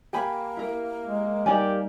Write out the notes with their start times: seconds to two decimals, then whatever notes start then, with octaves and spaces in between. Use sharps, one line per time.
0.13 A#3 G4 G5 G#5 B5
0.57 E4 A#4
1.05 G#3
1.46 G3 D#4 G4 A#4 D5 G#5